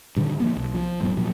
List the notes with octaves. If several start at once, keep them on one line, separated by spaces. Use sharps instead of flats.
G2 A#2 D3 D#3
F3 A#3 B3
B1
F3
D#1 G#2 F#3 B3
A#2 F3 F#3